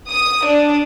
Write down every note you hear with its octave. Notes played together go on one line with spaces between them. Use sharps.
D#6
D4